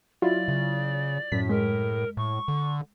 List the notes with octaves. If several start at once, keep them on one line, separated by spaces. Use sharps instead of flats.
F#3 E4 F4 D5
C#3
F#2 A2 B6
G#3 A#4
A2 C#6
D3